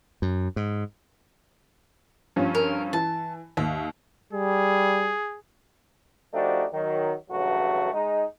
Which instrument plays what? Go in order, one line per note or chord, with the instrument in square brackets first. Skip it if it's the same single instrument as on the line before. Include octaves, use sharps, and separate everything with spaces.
[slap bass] F#2
G#2
[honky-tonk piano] G2 F3 C#4
[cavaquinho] A#4
[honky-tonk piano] E3 [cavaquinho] A5
[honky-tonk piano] D#2 [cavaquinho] E5
[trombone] G3 [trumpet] G#4
[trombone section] F3 A3 D4 D#4 F#4 G4
D#3 F#3
A1 G2 C#3 F#3 A3 F#4
G#3 D#4